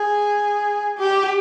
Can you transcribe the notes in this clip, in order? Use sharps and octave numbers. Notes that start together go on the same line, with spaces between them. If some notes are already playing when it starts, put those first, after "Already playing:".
Already playing: G#4
G4